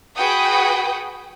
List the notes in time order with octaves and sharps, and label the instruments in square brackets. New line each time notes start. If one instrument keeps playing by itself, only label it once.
[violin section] F#4 G#4 B4 F#5 G5 D#6